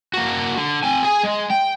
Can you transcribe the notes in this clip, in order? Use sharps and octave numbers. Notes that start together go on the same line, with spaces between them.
A#3 F#4
D3
C4 G#5
G#4 G#5
G#3
G5